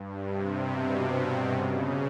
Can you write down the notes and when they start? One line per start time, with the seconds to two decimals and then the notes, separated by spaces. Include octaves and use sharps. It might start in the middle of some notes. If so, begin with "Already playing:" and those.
Already playing: G2
0.26 C3
0.68 B2
1.10 B2
1.52 C#3